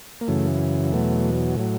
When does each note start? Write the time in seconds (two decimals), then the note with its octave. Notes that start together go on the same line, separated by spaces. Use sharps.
0.21 A#3
0.28 F#2 C#3 E3 A3
0.92 E2 B2 F#3 A3
1.57 A2 F#3